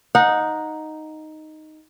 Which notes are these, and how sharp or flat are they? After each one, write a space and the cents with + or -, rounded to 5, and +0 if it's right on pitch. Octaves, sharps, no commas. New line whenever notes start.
D#4 +0 F#5 -25